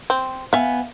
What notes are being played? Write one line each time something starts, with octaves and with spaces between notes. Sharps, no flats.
C4
B3 E5 F5 G#5